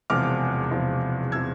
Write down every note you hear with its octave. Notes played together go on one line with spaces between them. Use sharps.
E1 E2 C3 F3 D6 F6
E1 E2 C3 F3
C3 F3 E6 G#6